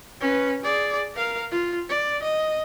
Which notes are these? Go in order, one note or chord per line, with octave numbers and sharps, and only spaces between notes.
C#4 B4
G#4 D5
A#4 F5
F4
D5
D#5